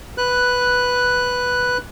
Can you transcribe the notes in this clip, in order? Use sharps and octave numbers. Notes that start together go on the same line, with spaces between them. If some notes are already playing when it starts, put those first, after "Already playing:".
B4 F#6